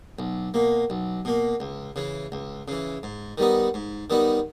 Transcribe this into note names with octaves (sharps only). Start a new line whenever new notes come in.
B1
B2 A#3
B1
B2 A#3
C#2
C#3 E3
C#2
C#3 E3
G#2
D#3 G3 B3 D#4
G#2
D#3 G3 B3 D#4